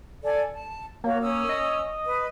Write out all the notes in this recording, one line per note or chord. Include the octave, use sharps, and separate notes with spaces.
A4 D5 G#5
A5
A#3 F#4 C#5
C#4 D#6 E6
D#5
B4